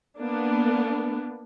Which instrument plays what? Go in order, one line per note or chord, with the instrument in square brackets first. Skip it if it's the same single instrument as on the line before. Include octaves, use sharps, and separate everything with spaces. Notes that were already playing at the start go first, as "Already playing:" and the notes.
[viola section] A#3 B3 D4